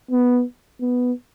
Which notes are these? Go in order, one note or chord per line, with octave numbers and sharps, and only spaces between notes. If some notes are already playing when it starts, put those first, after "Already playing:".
B3
B3